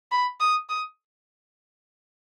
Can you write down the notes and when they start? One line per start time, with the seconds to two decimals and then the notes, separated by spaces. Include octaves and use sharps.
0.12 B5
0.40 D#6
0.69 D#6